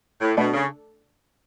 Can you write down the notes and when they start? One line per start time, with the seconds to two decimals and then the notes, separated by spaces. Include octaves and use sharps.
0.21 A2
0.37 B2 A3 D4 A4
0.54 C#3